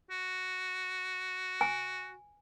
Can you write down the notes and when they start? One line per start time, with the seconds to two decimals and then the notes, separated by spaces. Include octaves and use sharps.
0.11 F#4
1.61 G#5